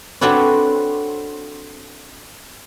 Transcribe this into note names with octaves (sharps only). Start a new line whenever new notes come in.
C4 D4 F#4 A4 B4 C#5